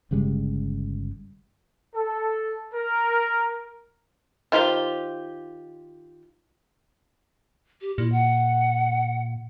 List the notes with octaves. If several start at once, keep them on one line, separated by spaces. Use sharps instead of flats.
G1 C#3 G3 G#3
A4
A#4
D#3 F4 G4 C5
G4
A#2 E4
F#5